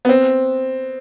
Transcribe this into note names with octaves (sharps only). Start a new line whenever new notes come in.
B3
C4